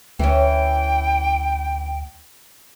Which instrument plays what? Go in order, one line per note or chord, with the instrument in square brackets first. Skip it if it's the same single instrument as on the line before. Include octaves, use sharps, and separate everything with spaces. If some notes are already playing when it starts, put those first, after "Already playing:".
[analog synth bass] D2 [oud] E3 C#4 [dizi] G5